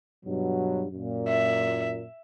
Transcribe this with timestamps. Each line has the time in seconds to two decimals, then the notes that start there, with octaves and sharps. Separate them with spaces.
0.24 G2 B2 F#3
0.92 F#2 A#2
1.28 E5